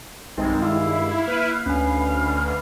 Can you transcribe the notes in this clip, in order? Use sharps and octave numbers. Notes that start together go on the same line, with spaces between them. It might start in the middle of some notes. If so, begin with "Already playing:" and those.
B1 G2 D#3 G#3 C4 D#4
E4 F5 D6 E6
A#3 B4
D2 C#4 D4 G#5